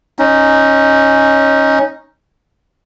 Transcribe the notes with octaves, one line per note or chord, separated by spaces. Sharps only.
C#4 D#4